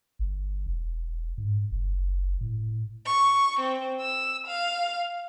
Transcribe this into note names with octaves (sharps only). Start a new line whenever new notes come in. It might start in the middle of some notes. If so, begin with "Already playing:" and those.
G1
E1
G#2
F#1
A2
C#6
C4
E6
F5